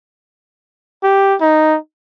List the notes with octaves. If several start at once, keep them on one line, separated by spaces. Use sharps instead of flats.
G4
D#4